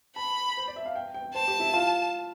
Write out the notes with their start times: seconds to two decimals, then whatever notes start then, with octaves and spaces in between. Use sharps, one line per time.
0.16 A5 B5
0.57 C5
0.68 D5
0.76 E5
0.86 F5
0.95 G5
1.14 G5
1.34 C5 A5
1.48 G4
1.60 E4
1.74 F4